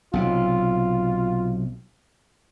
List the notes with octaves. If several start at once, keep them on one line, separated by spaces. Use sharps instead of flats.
B1 C3 F4